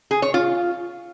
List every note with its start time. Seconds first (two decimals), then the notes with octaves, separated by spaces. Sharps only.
0.11 G#4
0.22 C#5
0.34 F4